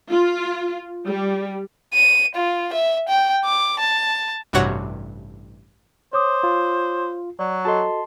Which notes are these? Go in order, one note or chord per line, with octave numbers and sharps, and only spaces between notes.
F4
G3
D#7
F4
E5
G5
D6
A5
A1 G2 C3 F#4 C#5 F#5
C5 C#5 D6 D#6
F4
F#3 D5
F#4 A4 D#5 A5 C6